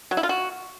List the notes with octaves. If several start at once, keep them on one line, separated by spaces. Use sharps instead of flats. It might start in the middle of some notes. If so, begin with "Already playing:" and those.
F#3
E4
F4
F#4